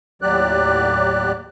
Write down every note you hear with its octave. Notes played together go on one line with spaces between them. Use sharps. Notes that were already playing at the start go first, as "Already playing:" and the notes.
D#2 A2 F#3 G4 D5 F#6